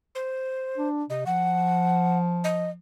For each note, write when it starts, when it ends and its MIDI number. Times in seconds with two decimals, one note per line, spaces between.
0.15 0.88 72
0.77 1.04 62
1.10 1.22 48
1.10 1.24 75
1.26 2.78 53
1.26 2.18 78
2.44 2.70 75